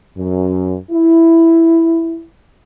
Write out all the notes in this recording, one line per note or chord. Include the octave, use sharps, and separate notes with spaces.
F#2
E4